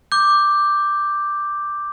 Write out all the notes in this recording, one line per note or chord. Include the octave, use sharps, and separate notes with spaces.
D6 G6